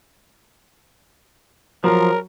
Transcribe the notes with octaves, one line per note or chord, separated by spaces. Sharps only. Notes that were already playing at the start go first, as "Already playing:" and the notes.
F3 F#3 A#4